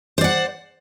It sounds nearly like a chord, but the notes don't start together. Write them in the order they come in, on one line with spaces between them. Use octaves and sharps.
C5 D5 F#5